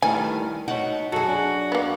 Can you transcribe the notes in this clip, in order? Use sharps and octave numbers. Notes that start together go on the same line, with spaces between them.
D#3 E3 G3 A3 G#5
D#4 F#4 C#5
F#2 F#4 G#4 A4
D4
A#3 B3